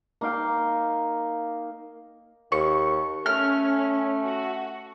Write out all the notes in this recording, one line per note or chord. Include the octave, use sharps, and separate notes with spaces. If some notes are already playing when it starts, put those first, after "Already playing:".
A#3 D#4 F5 G5
D#2 C#6
A3 C#4 F6
F#4